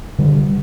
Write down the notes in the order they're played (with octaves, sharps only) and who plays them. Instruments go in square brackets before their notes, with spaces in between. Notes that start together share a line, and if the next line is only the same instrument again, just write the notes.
[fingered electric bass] D3 G3